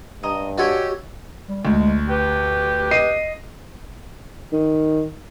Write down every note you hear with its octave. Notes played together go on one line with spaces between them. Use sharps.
G2 D#5 A#5 D#6
F#4 G4 A4 C#5 D#5 F#5 G#5
G3
D2 G#3
G4 B4
D#5 C7 D#7
D#3